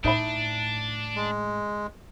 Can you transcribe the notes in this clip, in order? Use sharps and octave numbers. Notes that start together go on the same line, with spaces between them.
A2 D4 D#4 E5 B5
G#3